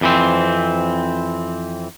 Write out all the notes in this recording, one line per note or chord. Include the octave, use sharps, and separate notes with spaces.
F2 E3 C4